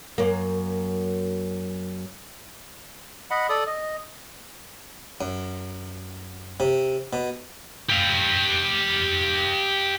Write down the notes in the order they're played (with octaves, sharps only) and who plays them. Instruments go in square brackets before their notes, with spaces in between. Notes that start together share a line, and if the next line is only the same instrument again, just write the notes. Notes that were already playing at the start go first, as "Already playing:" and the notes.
[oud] F#2 A#3
[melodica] D#5 F#5 B5
A4 D5 D#6
D#5
[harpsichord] F#2
C3
B2
[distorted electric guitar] G4 F5